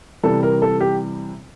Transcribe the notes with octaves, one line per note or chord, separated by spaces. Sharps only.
C3 E3 G3 A4
A#4
A4
G4